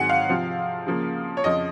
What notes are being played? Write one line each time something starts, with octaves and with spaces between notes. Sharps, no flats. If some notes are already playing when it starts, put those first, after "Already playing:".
Already playing: G#2 D#3 F#3 C4 F#5 G#5
F5
C3 F3 C4
C#3 F3 A#3
C#5
F2 C#3 F3 D#5